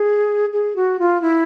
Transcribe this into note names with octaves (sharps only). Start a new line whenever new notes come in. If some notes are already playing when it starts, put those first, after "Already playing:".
Already playing: G#4
G#4
F#4
F4
E4